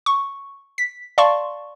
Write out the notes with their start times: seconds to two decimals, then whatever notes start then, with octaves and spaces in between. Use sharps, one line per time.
0.06 C#6
0.78 B6
1.18 D5 F5 A5 C6 C#6